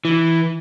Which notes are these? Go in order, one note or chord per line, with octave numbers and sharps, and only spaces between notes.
E3